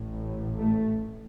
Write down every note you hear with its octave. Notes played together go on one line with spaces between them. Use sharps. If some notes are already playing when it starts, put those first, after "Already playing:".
Already playing: A1 A2
A3